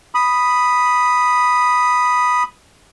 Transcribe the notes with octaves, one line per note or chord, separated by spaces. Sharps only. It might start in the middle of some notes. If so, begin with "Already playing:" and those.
B5 D#6